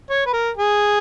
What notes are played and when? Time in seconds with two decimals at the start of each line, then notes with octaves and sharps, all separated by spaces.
0.10 C#5
0.26 B4
0.33 A#4
0.57 G#4